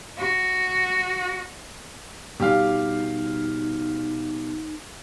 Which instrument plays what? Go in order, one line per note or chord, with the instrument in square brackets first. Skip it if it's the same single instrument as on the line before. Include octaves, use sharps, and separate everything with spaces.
[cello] F#4
[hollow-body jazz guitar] B2 G3 [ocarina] D#4 [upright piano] G4 F5